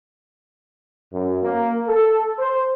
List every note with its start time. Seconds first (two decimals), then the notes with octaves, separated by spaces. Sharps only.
1.12 F#2
1.43 A#3
1.87 A4
2.39 C5